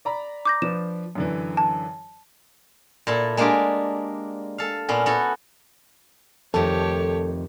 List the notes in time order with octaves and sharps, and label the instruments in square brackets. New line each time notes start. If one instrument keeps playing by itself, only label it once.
[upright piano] D5 A#5 B5
[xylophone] D6 G6 A#6
[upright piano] F3 D4 B4 [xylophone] E7
[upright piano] F#2 D3 E3
[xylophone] A5
[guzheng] A#2 E4 A4
G#3 A#3 D4 F4 G4 G#4
A4 F5
A#2 B3 C#4
B3 E4 F#4 A4
[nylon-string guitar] F2 [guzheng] C3 D#3 A3 [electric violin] G4 C#5 [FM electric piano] A4